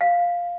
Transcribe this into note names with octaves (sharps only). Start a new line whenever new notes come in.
F5